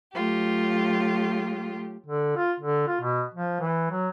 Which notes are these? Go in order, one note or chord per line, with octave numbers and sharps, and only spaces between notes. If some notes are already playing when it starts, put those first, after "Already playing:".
F#3 A3 F4 G4
D3
F4
D3
F4
B2
F3
E3
F#3